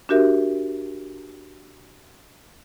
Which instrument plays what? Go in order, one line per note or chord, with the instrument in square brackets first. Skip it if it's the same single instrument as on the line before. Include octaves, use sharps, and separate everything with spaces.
[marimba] D4 F#4 G4 A#4 E5